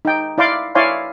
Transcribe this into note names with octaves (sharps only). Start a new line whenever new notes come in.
D#4 G5
E4 D5 F5 C6 D6
E4 C#5 D5 F5 G#5 C6